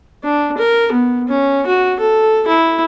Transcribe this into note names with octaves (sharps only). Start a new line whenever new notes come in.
D4
A#4
B3
C#4
F#4
A4
E4